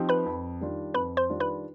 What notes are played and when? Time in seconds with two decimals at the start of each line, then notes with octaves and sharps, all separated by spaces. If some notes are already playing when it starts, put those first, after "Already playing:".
Already playing: F3 C4 D#4 G4
0.09 B4 B5
0.26 F2
0.61 D#3 G3 D4 F4
0.94 F2 B4 B5
1.17 C5 C6
1.29 D#3 G3 D4 F4
1.40 B4 B5